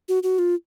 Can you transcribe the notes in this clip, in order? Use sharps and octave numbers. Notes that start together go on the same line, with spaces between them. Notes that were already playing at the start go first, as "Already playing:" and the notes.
F#4
F#4
F4